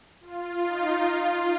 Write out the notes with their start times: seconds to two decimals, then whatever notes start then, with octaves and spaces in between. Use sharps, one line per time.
0.21 F4
0.62 D#4
1.05 F4